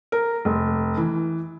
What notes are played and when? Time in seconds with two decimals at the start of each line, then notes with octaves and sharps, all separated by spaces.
0.12 A#4
0.45 F1
0.97 E3